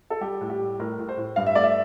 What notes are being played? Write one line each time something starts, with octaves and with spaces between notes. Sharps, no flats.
A4
G3 G4
A2
G4
G3
A2 A#4
A2
C5
A2
G2 F5
E5
A3 D5
E5